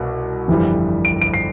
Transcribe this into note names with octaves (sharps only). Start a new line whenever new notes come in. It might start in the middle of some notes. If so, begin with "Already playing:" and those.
Already playing: C2 B2
G1 F2 E3 G3
D7
D7
C7